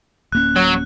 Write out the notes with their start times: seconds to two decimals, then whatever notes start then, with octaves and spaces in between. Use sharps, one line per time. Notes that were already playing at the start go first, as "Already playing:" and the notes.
0.32 D1 A#3 C#4 F#6
0.56 F#3